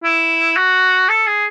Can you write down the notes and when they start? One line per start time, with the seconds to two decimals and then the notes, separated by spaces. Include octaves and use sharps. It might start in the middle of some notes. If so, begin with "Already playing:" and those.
0.03 E4
0.56 F#4
1.09 A4
1.27 G#4